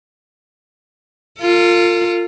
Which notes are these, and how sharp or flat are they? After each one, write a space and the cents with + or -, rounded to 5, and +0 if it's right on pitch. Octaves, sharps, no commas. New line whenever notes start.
F4 +0 A#4 -45